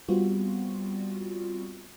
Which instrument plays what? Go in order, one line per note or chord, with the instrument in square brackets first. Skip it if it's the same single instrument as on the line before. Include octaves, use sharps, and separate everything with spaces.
[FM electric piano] G3 B3 C4 F4 F#4